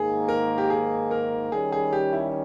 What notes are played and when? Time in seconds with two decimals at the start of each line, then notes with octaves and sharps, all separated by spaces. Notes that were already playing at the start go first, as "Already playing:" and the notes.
Already playing: G#2 D#3 A#3 G#4
0.28 A#4
0.58 G4
0.70 G#4
1.11 A#4
1.52 D#3 G3 C#4 G#4
1.72 G#4
1.93 G4
2.13 E4